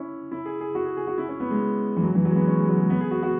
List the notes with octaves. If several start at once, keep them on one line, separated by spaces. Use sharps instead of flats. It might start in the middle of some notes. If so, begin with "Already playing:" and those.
Already playing: C#4 E4
E4
G#4
G#4
F#4
G#4
G#4
F#4
E4
C#4
B3
G#3
E3
F#3
E3
F#3
G#3
B3
C#4
G#3
F#3
G#3
B3
G#4
F#4
F#4